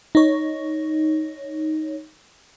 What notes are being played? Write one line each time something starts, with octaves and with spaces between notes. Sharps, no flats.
D#4 C#5